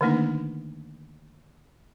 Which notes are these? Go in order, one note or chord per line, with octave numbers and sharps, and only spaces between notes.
D3 D#3 A3 A#3 D4 D#4